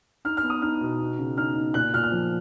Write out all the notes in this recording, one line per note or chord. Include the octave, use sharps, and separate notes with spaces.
D#4 F6
F6
B3
D#6
D#4 F6
B2
B3
C#3
D#4 F6
D#4
A#2 F#6
A#2 F6
F6
F3